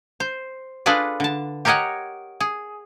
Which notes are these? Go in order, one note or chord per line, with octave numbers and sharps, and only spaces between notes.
C5
D4 F4 G#4 A4 B4 D5
D3 A5
G4 A#4 C#5 D#5 F#5 G#5
G#4